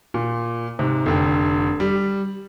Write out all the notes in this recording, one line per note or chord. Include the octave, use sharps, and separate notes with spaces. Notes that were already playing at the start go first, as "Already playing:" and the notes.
A#2
G#2 C3
F1 D3 G5
G3